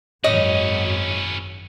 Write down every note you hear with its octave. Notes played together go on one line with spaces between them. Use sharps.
G#1 F#2 C#4 E4 C#5 D#5